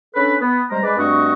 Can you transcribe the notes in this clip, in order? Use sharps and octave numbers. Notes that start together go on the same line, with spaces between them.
C#4 D4 A4 B4
B3
C3 G3 G#3 C5 A#5
G#3 B4 D5
G2 A3 C4 F#4 D#5 C#6